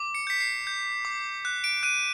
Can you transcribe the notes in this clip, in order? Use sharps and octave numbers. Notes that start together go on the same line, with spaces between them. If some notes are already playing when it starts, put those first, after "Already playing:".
Already playing: D6
C#7
G6 B6
C7
G6
D6
F#6
D7
F#6 D#7